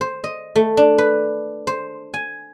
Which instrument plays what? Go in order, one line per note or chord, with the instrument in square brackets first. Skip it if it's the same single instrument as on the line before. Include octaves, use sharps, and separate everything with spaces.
[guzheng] C5
D#5
A3
D4
B4
C5
G#5